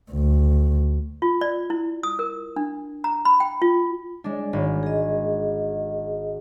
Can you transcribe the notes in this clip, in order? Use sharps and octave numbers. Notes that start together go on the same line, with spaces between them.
D2
F4
D5
E4
D#6
A#4
D4
A#5
B5
G5
F4
G#3 D4
G#1
G#4 D#5